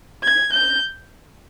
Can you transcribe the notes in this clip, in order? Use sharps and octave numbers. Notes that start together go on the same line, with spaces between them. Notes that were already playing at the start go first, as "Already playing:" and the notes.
G#6
G6